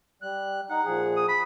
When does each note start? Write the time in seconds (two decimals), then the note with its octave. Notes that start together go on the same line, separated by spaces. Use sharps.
0.22 G3 F#6
0.70 D#4 F#5
0.85 A#2 F3 G#4
1.16 D#6
1.29 B5